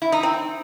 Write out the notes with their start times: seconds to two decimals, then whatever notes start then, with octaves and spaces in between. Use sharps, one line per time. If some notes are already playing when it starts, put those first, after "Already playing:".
0.02 E4
0.12 D#4
0.23 C4